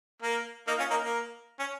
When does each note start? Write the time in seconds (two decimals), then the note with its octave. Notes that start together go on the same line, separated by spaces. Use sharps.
0.22 A#3
0.67 A#3 D#4
0.79 C#4 F4
0.90 A#3 D#4
1.01 A#3
1.59 C#4